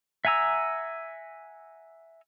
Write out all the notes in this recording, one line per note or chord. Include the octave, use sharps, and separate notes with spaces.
E5 F#5 G#5 A#5 E6